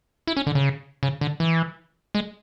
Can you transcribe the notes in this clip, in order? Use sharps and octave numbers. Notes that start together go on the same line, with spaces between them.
E4
C#4
D3
C#3
C#3
D3
E3
G#3